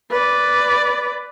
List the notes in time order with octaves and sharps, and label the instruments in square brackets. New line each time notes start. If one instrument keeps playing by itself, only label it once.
[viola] B4 D5